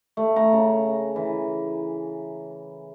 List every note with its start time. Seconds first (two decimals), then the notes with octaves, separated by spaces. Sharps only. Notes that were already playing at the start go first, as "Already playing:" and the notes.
0.17 A3
0.36 A#5
0.53 C#3
1.16 E3